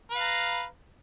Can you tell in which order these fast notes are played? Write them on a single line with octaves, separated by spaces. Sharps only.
B4 F5 A#5